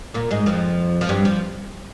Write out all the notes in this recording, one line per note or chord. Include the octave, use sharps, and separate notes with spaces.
A#2 A#3
G#2 G#3
F2 F3
F3
G2 G3
F3